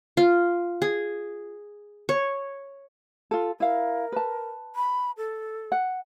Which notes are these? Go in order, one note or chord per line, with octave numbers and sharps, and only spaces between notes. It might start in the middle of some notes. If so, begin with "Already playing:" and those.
F4
G#4
C#5
F4 A4
E4 A#4 F5
B4 A5
B5
A4
F#5